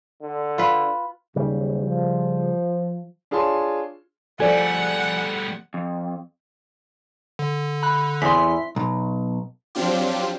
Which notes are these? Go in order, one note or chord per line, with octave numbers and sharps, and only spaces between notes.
D3
F4 B4
F#1 D#2 C#3 G3
F3
D4 F4 G#4 C#5 A5 C6
F3 G3 A3 A4 D5 F#5 G#5
F2
D3
B5 F#6
E2 E4 C6 B6
B1
F3 F#3 C4 D4 F4 G4